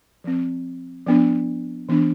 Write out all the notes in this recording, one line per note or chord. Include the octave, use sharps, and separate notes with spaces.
F3 C4
F3 B3 D4
E3 B3 D4